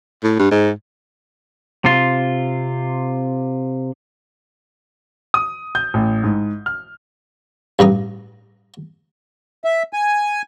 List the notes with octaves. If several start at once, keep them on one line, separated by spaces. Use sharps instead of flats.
A2
G2
G#2
C3 F4
D#6
G6
A1
G#2
F6
A1 G2 A#5 D#6
E5
G#5